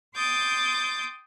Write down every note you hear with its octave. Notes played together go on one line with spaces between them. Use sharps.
G5 C6 D6 D#6 G6 A6